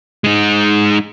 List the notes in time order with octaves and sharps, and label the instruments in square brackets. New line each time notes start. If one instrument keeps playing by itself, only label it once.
[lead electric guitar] G#3 D#4